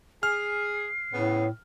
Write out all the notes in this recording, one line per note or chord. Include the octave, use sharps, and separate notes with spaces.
G#4 F6 C7
A2 C#3 B3